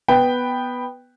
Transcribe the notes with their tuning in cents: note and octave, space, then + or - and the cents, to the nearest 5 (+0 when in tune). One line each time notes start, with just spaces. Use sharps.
B3 +0 B4 +0 G5 +0